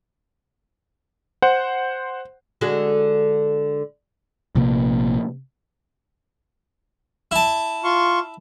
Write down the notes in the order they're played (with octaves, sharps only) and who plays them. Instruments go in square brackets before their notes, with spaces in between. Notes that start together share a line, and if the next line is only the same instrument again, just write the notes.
[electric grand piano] C5 F#5
[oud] D3 G#3 F#4
[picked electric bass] A#1 C3 A#3
[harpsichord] E4 A5
[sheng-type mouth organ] F4 C6 C#6